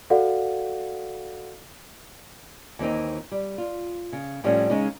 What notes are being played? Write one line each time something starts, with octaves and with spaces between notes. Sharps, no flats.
F#4 A4 D5 F5 F#5
D#2 E3 C4 D#4
G3
F4
C#3
A2 F3 G3 A3 C#4
C#3 G#3 C#4 D#4